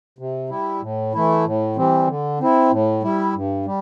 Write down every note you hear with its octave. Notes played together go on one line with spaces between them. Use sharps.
C3
G3 E4
A2
E3 A3 E4
A2
E3 G3 C4
D3
C4 E4
A2
G3 E4
G2
G3